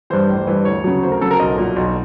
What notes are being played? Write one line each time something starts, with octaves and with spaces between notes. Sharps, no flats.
G2 E3 C5
A1
G2 E3
D2 C#5
C#3 F#3
D2 C5
A#4
C#3 F#3 A4
A#4
B1 D#5
A#2 F#3
B1